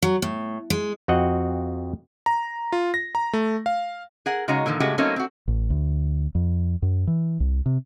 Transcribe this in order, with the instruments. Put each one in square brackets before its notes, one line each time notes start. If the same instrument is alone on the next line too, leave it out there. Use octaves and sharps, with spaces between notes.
[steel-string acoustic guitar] F#3
A2
G#3
[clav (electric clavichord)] F2 C4 F#4 D#5 F#5
[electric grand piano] A#5
F4
A#6
A#5
A3
F5
[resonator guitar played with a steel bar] G#4 A#4 F#5
C#3 G#3 D#4 F#4 C#5 A#5
A#2 D3 D#3 F3
A2 C#3 G#3 A3 F#4 G4
F#3 A3 A#3 C4 C#4 D#4
C4 F#4
[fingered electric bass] A1
D2
F2
F#2
E3
C2
C3